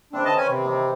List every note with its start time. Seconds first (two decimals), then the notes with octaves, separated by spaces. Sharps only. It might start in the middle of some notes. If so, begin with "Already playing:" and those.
0.13 C#3 E3 C4 D4
0.25 D#3 E3 D#5 A5
0.37 C#4 G#5
0.49 C3
0.65 E3 C4 D#4